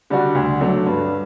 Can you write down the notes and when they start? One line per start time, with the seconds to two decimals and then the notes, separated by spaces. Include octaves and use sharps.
0.10 D3 G3 D4 F#4
0.35 D2
0.61 D3 F#3 A3 D4
0.86 G2